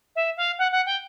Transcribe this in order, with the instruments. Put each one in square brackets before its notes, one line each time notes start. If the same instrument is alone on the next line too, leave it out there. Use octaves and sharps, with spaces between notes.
[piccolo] E5
F5
F#5
F#5
G5